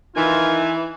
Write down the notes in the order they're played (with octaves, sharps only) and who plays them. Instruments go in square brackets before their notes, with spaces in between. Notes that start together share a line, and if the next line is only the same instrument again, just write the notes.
[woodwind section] D#3 D#4 F4 [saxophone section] E3 [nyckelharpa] G#5